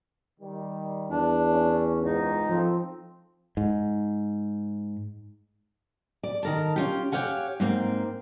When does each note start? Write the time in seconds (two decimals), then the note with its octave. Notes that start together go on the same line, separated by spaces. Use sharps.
0.40 D#3 G3
1.10 E2 D4
1.50 C#4
2.02 C#2 G#2 D#4
2.49 F3 C4 A4
3.57 G#2
6.23 D5
6.43 D#3 A#4 A5
6.76 C#4 F4 G4
7.12 G4 C#5 F5 F#5 G#5
7.60 G#2 A#3 C4